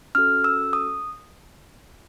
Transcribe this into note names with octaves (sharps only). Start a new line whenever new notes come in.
C#4 F#4 A4 F6
E6
D#6